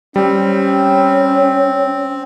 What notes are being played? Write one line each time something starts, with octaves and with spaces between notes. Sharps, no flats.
G3 C4 C#4